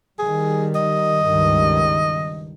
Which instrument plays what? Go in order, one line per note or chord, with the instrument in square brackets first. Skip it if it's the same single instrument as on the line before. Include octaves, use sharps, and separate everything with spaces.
[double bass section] D#3 G3 [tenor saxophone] G#4
[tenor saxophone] D#5
[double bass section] C#2 G2 D#3